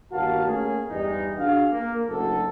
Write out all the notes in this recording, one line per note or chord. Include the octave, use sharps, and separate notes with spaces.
G1 D#2 A#3 F#4 F5 A5
A3 A#3 C#4 G#4
E2 G2 E3 G3 G#3 D#4
D4 F#4 G#4 F5
A#3
F#1 D2 F#3 A4